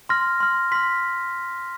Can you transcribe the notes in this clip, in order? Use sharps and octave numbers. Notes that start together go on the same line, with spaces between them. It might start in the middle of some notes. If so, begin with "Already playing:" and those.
C6 F6 A#6
C6 F6
C6 F6 B6